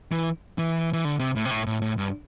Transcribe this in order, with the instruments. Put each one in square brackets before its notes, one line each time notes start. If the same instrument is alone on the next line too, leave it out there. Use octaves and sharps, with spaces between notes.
[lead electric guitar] E3
E3
E3
D3
C3
A2
C3
A2
A2
A2
G2